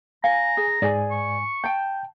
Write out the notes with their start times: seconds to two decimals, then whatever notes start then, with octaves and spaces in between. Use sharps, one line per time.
0.24 F5 G#5 A#5
0.57 G#4
0.82 G#2 G#4 D5 G#5
1.11 C#6
1.64 G5 A5 G6